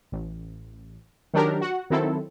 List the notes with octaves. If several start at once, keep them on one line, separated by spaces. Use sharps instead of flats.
A1
D#3 F#3 D4 G4 A#4
F#4 F#5
D#3 F#3 C4 E4 A4